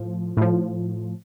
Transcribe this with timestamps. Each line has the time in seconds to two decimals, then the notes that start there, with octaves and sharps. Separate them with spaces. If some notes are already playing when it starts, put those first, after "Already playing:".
Already playing: A2 F3
0.37 A2 F3